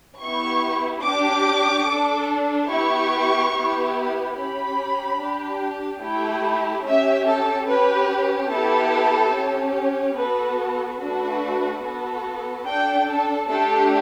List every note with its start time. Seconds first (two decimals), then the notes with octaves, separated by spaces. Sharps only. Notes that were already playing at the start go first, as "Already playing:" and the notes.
0.21 B3 E4 G4 C#6
1.05 D4 G4 D6
1.87 D4 A4
2.70 B3 E4 G4 C#6
3.54 B3 E4 G4
4.37 C#4 G4 B5
5.19 D4 G4
6.02 A3 E4 G4 G5
6.86 C#4 G4 E5
7.27 A4
7.69 C#4 G4 B4
8.52 B3 E4 G4 A4
9.35 C#4 G4
10.18 B3 F#4 A4 B4
11.00 A3 D4 F#4 A4 B4
11.84 B3 F#4 A4
12.67 D4 A4 G5
13.09 A4
13.50 A3 D4 G4 A4